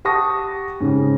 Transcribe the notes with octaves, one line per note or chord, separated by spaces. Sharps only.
G4 F#5 A5 C#6 D#6 A#6
G#2 C#3